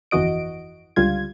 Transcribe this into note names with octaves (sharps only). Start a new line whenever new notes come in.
G1 F2 E3 F#4 D#5 D7
C#2 D3 G3 F4 G#6